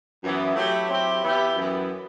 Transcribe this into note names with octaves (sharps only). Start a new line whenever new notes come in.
F#2 E3 B3
F#3 A3 E4 G4
F#3 C4 E4 G4
E3 B3 E4 G4
F#2 E3 B3